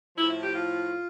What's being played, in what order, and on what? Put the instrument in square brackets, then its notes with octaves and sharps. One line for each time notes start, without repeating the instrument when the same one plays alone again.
[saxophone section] A2 F3 E4
E4
G4
F4